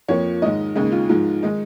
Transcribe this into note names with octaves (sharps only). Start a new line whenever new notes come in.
F2 F3 A#3 C#5
G#2 D#3 G#3 D#5
D#2 C#3 G#3 D#4
F4
G#2 F3 G#3
D#3 G#3 D#4